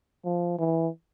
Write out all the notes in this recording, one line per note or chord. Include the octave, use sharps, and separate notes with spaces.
F3
E3